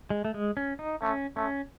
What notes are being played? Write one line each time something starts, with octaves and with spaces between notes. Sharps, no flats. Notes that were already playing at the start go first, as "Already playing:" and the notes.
G#3
A3
G#3
C#4
D#4
A3 C#4
A3 C#4